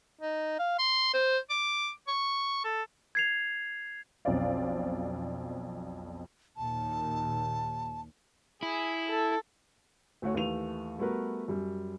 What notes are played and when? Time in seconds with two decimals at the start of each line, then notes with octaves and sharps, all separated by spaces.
0.21 D#4
0.59 F5
0.79 C6
1.14 C5
1.50 D6
2.08 C#6
2.65 A4
3.15 G#6 C7 F7
4.25 B1 F2 C#4 C5 D5 F5
6.57 D#2 A#2 A5
8.63 E4 G#4
9.09 A4
10.22 D2 A3 F#4 C#5
10.35 D#2 E3 A3 D#7 F7
10.98 G3 A3 B3 F#4 A#4 B4
11.48 F#2 G3